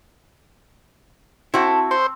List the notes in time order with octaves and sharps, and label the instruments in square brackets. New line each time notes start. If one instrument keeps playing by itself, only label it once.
[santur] C4 [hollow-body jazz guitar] E4 F#4 [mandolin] A4
[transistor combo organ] C5 [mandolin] C#6